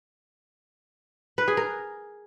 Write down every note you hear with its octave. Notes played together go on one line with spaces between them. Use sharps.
B4
G#4
A#4